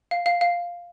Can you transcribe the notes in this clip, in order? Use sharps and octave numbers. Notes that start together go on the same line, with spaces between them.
F5
F5
F5